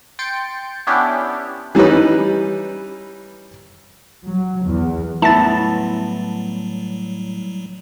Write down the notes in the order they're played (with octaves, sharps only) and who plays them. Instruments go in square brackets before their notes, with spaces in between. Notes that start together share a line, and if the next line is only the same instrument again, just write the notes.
[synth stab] G5 C6 A6 C#7 D7
B3 C#4 D4 E4 G4
[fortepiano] E3 G3 C#4 D#4 B4
[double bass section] F#3
E2
[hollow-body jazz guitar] A2 B3 [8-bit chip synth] F#3 G3 [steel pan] E4 [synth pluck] A5 A6